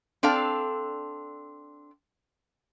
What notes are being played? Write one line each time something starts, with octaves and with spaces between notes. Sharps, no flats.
C4 D4 A4 F5 A5